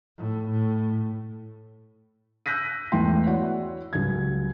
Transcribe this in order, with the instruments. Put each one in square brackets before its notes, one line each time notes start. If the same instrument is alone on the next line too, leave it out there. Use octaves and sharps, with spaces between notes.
[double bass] A2
A2
[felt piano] E6 F#6 G6 A#6 B6 D#7
E2 E3 G#3 A3 G5 C6
E4 F#4 C#5 D5 F#5
C#2 F#3 G3 G#6